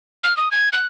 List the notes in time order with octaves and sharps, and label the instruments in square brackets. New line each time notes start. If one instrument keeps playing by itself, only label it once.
[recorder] F6
D#6
G#6
F#6